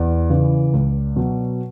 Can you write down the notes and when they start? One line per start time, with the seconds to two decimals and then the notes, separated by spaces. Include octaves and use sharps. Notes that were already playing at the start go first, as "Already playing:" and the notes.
Already playing: E2 D5
0.30 C#3 E3
0.73 C#2
1.16 B2 F#3